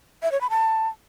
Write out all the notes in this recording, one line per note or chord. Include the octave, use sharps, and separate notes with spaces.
E5
C#5
B5
A5